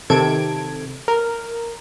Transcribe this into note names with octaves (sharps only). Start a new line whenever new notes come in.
C3 D#3 A4 G#6 D7
A#4